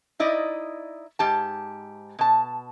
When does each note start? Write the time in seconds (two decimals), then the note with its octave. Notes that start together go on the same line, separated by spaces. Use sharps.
0.20 D#4 E4 D5 D#5
1.19 G#2 G4 A5
2.19 B2 A5